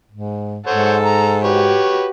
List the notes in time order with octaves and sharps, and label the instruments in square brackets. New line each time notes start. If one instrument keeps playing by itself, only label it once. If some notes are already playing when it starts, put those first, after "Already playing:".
[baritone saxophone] G#2
[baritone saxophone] G#2 [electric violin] A4 [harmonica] C5 C#5 F#5
[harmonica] A#5
[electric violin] F#4 G4 [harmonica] B4 C#5